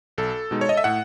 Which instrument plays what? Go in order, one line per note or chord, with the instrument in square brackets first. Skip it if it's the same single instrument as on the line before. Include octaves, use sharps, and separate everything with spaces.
[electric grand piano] B1 A4
B2 G#3 D#4
C#5
D#5
E5
A2 F#5